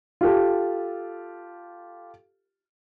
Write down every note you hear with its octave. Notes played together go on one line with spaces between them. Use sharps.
F4 G4 A4